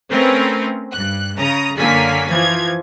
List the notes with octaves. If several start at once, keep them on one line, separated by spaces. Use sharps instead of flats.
A3 C4 C#4 A#4 B4
G2 F#6
C#3 A#5 D#6
F#2 D3 A#3 C#4 G#5 B6
E3 F3 G#6